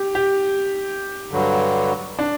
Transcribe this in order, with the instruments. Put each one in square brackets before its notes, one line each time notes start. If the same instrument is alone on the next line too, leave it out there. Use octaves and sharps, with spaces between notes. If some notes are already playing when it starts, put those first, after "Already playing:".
Already playing: [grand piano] G4
G4
[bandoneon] G2 D3 F#3
[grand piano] D4